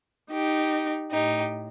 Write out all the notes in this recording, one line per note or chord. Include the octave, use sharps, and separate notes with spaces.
D#4 G4
A2 D#4 G4